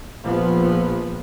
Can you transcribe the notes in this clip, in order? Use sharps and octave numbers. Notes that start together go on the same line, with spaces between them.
A#1 F3 B3